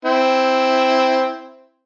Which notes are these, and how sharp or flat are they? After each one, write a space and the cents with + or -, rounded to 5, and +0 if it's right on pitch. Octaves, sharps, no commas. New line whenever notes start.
C4 +0 E4 +0